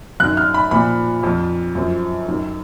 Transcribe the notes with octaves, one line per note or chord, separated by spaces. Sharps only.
F#2 D#3 F#6
F6
B5
A#2 F3 B5
F2 F3
F#2 F3
F#2 D#3